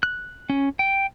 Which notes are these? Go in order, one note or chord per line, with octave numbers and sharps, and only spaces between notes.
F#6
C#4
G5